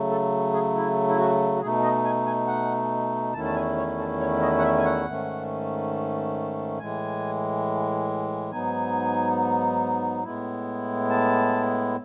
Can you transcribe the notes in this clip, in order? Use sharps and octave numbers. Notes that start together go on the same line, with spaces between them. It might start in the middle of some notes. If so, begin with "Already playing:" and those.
Already playing: C#3 F#3 A3
A4
G#4
E4
E4
F#4
F#4
B2 A3 D#4 G#4
D#5
G#5
G#5
F#5
E2 D#3 A3 C#4 E4 A5
A5
G#5
C#5
A4
C#5
D#5
F#5
E5
G#5
F#5
G#2 D#3 A3 C#4
A2 E3 G#3 G#5
G#2 F#3 B3 D#4 G#5
A2 G#3 B3 E4
A5